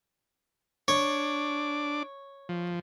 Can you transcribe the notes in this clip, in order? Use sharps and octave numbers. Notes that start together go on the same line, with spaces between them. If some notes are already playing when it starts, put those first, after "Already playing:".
D4 C#5 D6
F3